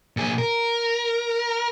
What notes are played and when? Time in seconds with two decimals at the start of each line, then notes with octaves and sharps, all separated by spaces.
0.17 A#2 G#4
0.38 A#4